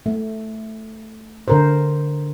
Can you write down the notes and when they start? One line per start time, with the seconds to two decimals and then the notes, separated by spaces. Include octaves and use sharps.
0.06 A3
1.48 D3 A#4 C5